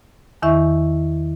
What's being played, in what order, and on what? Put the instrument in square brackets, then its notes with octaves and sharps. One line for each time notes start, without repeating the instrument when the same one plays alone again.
[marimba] E2 D#3 E4 E5 C#6